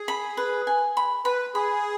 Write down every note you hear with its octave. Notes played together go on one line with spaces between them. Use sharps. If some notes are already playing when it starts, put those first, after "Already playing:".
Already playing: G#4
B5
B4
G#5
B5
B4 B5
G#4 B5